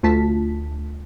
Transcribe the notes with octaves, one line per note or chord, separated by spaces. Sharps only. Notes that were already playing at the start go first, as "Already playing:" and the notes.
D2 A3 F4 A5 B6